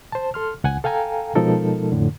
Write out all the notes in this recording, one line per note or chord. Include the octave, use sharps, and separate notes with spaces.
C5 A5
A4 C6 F6
C#2 F#5 G#5
A4 F5 G5 G#5 A#5
B2 F3 G#3 D#4 A4 A#4
F2 A2 D3